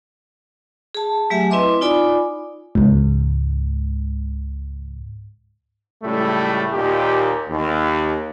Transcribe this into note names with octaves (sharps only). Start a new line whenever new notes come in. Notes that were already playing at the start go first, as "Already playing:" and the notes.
G#4 A5
F#3 A3 G4 E5 G#5
C4 E4 B4 D#5 C6 D6
D#4 F4 D5 G#5 B5 D6
C#2 G#2
C#2 A2 G3 A3
D#2 A#2 D#4 G4
D#2